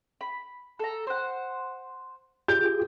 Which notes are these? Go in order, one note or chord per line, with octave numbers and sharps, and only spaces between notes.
B5
A4 A#5
C5 F#5
F4 G4 G#4 G6